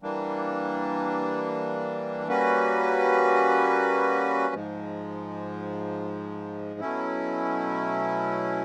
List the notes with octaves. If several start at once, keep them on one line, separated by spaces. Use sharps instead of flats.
E3 G3 A#3 D4
G3 A#3 C#4 F#4 B4
G#2 F3 G#3
B2 F#3 A3 C#4 E4